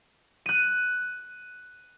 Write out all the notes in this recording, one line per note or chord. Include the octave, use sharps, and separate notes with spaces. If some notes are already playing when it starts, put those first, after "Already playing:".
F#6 D#7